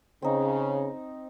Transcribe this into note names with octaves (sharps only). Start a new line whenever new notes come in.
C#3 C4 D#4